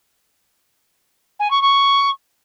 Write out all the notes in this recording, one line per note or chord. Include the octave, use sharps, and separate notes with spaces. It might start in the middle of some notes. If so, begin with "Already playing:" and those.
G#5
C#6
C#6